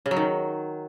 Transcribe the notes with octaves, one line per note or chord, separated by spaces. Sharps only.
C#3
F#3
D#3